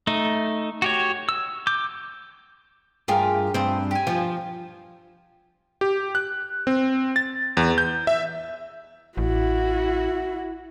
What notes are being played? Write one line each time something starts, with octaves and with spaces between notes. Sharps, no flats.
A3 D#4
F#4 G4 C#5
E6
D6 G6
G2 F4 G4 G#4 A#4
G2 C4 C5 D#5
G4 G#5
F3
G4
F#6
C4
A6
E2
G6
E5
A1 E4 F#4